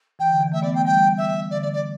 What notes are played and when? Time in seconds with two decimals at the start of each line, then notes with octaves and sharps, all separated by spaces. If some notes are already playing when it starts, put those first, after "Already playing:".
0.19 E3 G5
0.30 D3
0.41 E3
0.52 A3 E5
0.62 B3 D5
0.74 A3 G5
0.85 G3 G5
1.17 E5
1.50 D3 D5
1.62 D5
1.72 D5